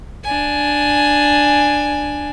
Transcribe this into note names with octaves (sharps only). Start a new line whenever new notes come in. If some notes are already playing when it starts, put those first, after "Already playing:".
D4 G#5